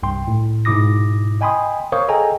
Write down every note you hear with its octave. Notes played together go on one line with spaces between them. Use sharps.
C2 G2 G5 C6
A2
G#2 B2 E4 D6 D#6 A#6
D#5 G5 G#5 B5 C6 D#6
A#4 C5 C#5 F5 C#6 D#6
G#4 A4 D#5 G5 G#5 A#5